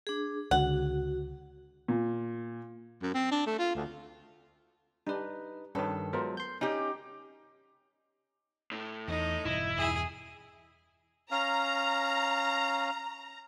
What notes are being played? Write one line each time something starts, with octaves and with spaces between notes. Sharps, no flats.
D4 G#4
C#2 D3 F#4 F#5
A#2
F#2
C4
D4
A3
F4
D2
G3 D4 D#4 B4
G2 D#3 C#4 A4 B4
F#3 G#3 B3 F4 A#4 C5
C6 G6
C#4 D#4 G4
A2
E2 D#4
E1 G2 E4
E2 G2 B2 G#4
C#4 F5 A#5